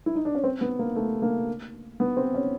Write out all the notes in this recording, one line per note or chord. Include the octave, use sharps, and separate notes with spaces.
E4
D#4
D4
C#4
C4
B3
A#3
A3
A#3
B3
C4
C#4